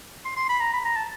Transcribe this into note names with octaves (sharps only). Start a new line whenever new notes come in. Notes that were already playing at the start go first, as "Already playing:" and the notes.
C6
C6
B5
A#5
B5
A#5
A5